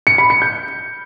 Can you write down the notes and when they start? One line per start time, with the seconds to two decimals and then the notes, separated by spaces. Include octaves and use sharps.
0.07 C#7
0.18 B5
0.30 C#7
0.42 G6